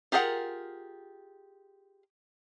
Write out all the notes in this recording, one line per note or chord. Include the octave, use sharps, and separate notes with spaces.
F4 G4 G#4 A#4 F#5